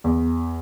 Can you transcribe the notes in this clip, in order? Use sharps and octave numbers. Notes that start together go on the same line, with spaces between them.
E2